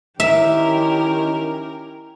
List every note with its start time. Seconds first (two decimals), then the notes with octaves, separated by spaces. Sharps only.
0.20 D#3 C#4 E4 G4 A#4 E5